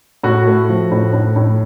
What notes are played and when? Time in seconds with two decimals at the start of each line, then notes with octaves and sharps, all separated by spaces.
0.23 A2 F#4
0.46 A3
0.69 F3
0.91 A2
1.13 A2
1.36 A2